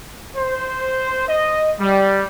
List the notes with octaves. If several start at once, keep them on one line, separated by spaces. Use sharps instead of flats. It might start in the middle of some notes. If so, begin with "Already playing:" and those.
C5
D#5
G3